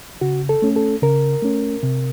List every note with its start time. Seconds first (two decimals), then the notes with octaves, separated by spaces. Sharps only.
0.21 C#3 F#4
0.49 A4
0.62 A3 C#4
0.76 A4
1.02 C#3 A#4
1.42 A3 C#4
1.83 C3